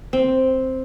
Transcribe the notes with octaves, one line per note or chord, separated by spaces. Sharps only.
C4